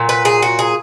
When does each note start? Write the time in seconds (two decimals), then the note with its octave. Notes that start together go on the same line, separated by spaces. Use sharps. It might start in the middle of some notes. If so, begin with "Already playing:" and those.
Already playing: A#2 F#3
0.09 B4
0.25 G#4
0.42 F#4
0.59 G#4